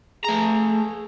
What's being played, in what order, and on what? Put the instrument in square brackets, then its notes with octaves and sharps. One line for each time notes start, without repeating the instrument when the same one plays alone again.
[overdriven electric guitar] A3 A#5 [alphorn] G#4